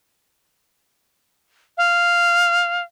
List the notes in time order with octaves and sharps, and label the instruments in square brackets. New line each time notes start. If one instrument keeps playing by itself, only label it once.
[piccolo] F5